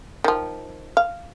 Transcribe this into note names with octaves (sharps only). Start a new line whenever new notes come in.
D#3 F3
F5